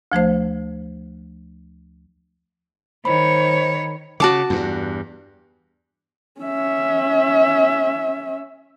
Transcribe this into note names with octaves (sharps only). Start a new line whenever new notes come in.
D2 F3 A3 C5
D#3 C5 C#5 B5
C#3 F#4 A5 D6
E2 G2
C#4 E5